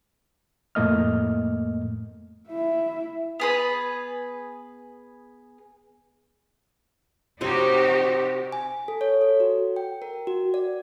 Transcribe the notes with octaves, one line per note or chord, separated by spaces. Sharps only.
F2 A2 A3 A#3 D#5 F6
E4 E5
B3 G#4 B4
C3 D#4 F#4 G4 C5 C#5
G#5
A4
C#5
A4
F#4
G5
A#4
F#4
D5